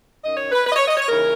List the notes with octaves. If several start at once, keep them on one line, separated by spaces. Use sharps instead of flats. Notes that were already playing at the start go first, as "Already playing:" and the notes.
F#2 D#3 D#5
C#5
B4
B4
D#5
C#5
D#5
C#5
D#2 C#3 E3 A#4